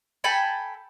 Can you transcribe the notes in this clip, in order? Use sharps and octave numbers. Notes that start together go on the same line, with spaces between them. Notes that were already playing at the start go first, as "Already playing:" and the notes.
A4 G5 G#5 B5